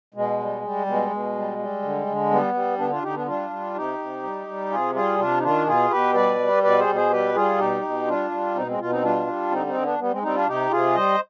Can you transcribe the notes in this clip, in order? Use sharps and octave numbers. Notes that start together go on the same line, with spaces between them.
B2 G#3
G3
G3
B2 G#3
B2
G3
G3
D3
D3
G3 B3
G3
D3 B3 D4
D4 F4
D3 D#4 G4
B3 D4
G3 D4 F4
G3
C3 D#4 G4
C3
G3
G3
C3 F4 G#4
G3 F4 G#4
C3 D4 F4
D#4
D#3 D4 F4
B2 F4 G#4
B2 G4 B4
G3 B4 D5
G3
B2 B4 D5
G#4 C5
B2
G#4 C5
G3 G4 B4
G3 F4 G#4
B2 D#4 G4
B2
G3 D4 F4
G3
B2 C4 D#4
G#3 C4
B2 F4
C4 D#4
G3 D4 F4
G3
D3 C4 D#4
C4 D#4
D3
B3 D4
G3 B3
G#3 C4
G3 C4 D#4
D4 F4
C3 D#4 G4
C3 F4 G#4
G3 C5 D#5